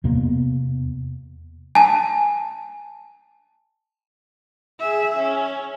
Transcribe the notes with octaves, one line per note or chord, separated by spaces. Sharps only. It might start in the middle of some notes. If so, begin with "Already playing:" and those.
E2 C3 A#3 B3
G#5 A5
G#4 E5
C#4